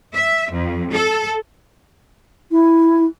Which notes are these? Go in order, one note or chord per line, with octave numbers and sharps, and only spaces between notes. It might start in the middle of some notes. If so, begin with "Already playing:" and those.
E5
F2
A4
E4